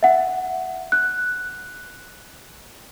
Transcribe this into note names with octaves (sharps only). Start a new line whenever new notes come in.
E5 F#5
F#6